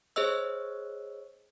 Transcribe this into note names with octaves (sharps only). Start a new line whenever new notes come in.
G#4 C5 C#5 D#5 E6